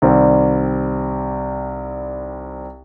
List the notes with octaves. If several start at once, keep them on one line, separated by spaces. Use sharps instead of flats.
C2 D#3 G3 C4